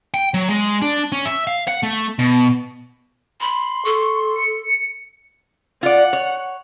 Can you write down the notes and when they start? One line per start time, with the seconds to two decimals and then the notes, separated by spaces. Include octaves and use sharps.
0.14 G5
0.34 F#3
0.49 G#3
0.82 D4
1.12 C#4
1.26 E5
1.47 F5
1.68 F#5
1.83 A3
2.19 B2
3.41 B5 C6
3.85 A4 C#6
4.36 C#7
5.83 F4 D5 F#5
6.13 C#5